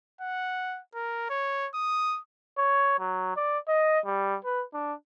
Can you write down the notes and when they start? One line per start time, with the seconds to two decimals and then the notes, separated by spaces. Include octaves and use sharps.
0.21 F#5
0.95 A#4
1.30 C#5
1.74 D#6
2.58 C#5
2.99 F#3
3.36 D5
3.68 D#5
4.06 G3
4.45 B4
4.74 D4